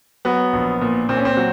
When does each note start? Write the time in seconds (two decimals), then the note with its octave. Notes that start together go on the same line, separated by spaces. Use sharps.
0.25 F#3 B3
0.53 A#1
0.81 A#2
1.09 A#2 C4
1.17 C#4
1.25 C4
1.37 F#3